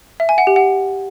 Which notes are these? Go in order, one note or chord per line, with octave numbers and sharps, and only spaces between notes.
E5
G#5
F#5
G4
F#5